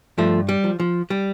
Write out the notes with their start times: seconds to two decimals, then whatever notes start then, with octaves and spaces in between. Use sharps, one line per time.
0.18 G2 F3 A3
0.49 G3
0.64 F3
0.80 F3
1.10 G3